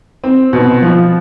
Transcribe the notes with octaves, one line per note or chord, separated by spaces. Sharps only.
C4
B2
F3